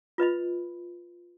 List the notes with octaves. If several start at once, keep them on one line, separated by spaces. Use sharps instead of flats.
F4 B4 D#5 B5